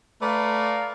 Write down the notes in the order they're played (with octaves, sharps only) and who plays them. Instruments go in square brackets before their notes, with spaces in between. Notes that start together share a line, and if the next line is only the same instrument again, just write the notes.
[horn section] A3 B4 D5 F5 A#5